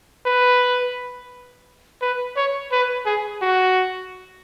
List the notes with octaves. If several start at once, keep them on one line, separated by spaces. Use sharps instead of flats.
B4
B4
C#5
B4
G#4
F#4